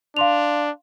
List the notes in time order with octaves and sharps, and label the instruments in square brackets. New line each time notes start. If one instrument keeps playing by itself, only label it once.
[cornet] D4 [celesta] F5 C6 F7